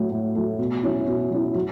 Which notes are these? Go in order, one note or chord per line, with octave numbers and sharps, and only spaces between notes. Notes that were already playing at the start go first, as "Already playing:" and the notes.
Already playing: A2 F#3 A3
A2
F#3 A3
B2
F#3 C#4 E4
B2
F#3 C#4 E4
F#3